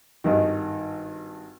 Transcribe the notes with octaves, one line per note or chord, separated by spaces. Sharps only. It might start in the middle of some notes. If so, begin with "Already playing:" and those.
G#1 G2 D#3